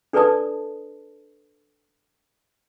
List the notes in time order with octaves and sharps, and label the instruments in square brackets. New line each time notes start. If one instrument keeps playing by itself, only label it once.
[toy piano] D4 A4 B4 D5 A5 D#6